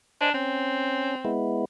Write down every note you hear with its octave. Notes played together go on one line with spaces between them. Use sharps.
D4 C5 D#5 G#5
C4 C#4
G#3 B3 E4